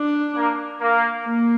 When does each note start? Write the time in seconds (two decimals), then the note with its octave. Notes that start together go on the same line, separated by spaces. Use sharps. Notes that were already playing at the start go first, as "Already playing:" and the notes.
Already playing: D4
0.36 A#3
0.81 A#3
1.26 A#3